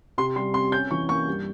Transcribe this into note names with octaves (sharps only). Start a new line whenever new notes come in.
C3 C6
G3 C6
C4 C6
C#4 G6
E3 C#6
A#3 C#6
G2